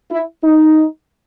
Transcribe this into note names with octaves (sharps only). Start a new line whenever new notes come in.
E4
D#4